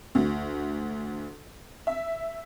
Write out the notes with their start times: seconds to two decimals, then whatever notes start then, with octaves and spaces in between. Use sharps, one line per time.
0.15 D2
1.87 E5